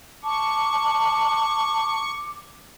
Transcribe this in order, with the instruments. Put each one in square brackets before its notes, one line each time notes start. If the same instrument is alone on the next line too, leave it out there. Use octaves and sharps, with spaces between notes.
[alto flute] A5 [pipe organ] C#6 [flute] D6